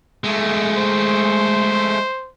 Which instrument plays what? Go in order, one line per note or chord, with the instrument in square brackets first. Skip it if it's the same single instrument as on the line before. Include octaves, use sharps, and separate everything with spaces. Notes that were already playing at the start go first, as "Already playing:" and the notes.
[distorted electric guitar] G#3 A3
[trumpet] C5